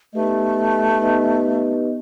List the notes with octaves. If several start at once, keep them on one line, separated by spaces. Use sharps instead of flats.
A3 B3 D#4 G4 B4 D#5
B3 D#4 G4 B4 D#5